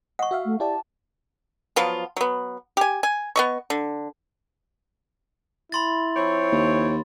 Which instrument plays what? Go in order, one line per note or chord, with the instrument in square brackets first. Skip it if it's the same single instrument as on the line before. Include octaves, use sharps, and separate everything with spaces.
[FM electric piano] D#5 [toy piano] F#5 C#6
[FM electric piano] F#4 E5 F5
[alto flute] A3
[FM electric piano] E4 G4 D5 [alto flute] A5
[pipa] F3 F#3 B3 F4
F#3 B3
G4 G#5
G#5
B3 D#5 C#6
D3
[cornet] E4 [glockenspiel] B5 C6 A6
[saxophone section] F3 C4 C#5
[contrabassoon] D#2